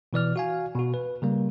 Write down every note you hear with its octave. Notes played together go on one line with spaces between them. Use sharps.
B2 E3 D5 F6
F#4 F5 G#5
B2 F#4
B4
C#3 G3 A#3